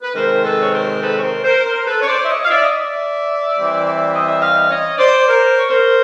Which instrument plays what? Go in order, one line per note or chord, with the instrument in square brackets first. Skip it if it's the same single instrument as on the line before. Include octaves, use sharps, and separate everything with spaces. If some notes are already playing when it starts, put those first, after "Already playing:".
[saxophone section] B4
C3 D#3 G#3 C4 A#4 C5
A4 B4
C#5
A#4 C5
A4 B4
C#5
A#4 C5
A#4 C5
A#4 C5
A4 B4
C#5
C5 D5
E5
C#5 D#5
F5
D5 E5
D#5
D5 E5
E3 G3 C4
D#5
E5
D#5 F5
C#5 D#5
C5 D5
A#4 C5
C#5
A#4 C5